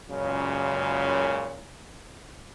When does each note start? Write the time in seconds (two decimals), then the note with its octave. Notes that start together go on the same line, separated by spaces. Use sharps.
0.10 C#2 F#2 A#2 C#3